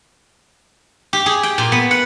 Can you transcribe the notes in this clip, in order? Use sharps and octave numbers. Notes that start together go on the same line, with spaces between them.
G4
G#4
G5
A#2
B3
F#5